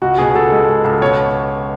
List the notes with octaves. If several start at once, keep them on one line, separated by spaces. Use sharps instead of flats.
C#2 F#4
B2 G#4
C#2 A4
G#3
C#2
C#2
B2 C#5